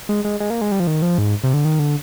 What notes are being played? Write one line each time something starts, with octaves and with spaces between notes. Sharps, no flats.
G#3
G#3
G#3
A#3
G#3
G3
F3
D#3
F3
G#2
C3
D3
D#3
D3